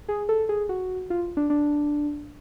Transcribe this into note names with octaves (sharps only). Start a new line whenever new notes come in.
G#4
A4
G#4
F#4
F4
D4
D4